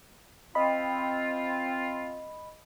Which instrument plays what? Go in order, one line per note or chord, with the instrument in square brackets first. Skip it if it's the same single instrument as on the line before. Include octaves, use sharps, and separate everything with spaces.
[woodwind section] C4 F4 [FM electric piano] D#5 B5